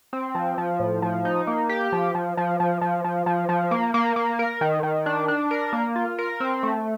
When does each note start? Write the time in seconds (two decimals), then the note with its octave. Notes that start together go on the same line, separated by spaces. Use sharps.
0.13 C4
0.35 F3
0.58 F3
0.80 A2
1.02 F3
1.25 D#4
1.47 A#3
1.69 G4
1.93 F3
2.15 F3
2.37 F3
2.60 F3
2.81 F3
3.04 F3
3.26 F3
3.49 F3
3.71 A#3
3.94 A#3
4.16 A#3
4.39 A#4
4.61 D#3
4.83 D#3
5.06 D4
5.28 D4
5.51 A#4
5.73 A#3
5.96 F4
6.19 A#4
6.40 C4
6.63 A3